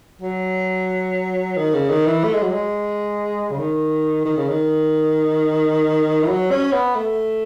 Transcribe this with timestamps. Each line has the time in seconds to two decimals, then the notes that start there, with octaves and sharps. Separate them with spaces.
0.22 F#3
1.57 D#3
1.74 C#3
1.90 D#3
2.07 E3
2.24 A3
2.34 G#3
2.43 F#3
2.52 G#3
3.52 C#3
3.59 D#3
4.25 D#3
4.37 C#3
4.49 D#3
6.23 E3
6.28 F#3
6.51 C#4
6.72 B3
6.95 A3